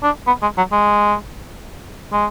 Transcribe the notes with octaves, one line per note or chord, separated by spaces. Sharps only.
D4
B3
G#3
F#3
G#3
G#3